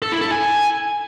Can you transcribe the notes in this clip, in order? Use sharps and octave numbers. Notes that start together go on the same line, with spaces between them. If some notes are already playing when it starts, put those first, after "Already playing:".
A4
E4
A4
G#5